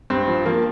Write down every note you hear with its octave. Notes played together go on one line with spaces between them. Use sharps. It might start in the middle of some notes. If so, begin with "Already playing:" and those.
G2 C4
F3
F3 A#3